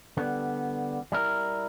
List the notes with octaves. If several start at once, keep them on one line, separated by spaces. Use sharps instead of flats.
D3 G3 B3
G3 E4 A#4